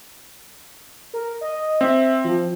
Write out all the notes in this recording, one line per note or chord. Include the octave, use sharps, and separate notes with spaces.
A#4
D#5
C4 E5
F3